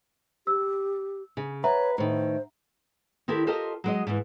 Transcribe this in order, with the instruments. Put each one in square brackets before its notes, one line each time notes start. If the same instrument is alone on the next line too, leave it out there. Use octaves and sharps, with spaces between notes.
[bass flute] G4 [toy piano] E6
[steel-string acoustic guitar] C#3
[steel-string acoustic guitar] B4 [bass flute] C#5 [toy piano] E5 F#5 A#5
[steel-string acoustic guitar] A2 D#3 [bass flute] C5
[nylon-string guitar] D#3 C4 E4 G4 A4 A#4
F4 G4 A4 A#4 C5 D#5
F#3 G#3 D#5
G#2 E3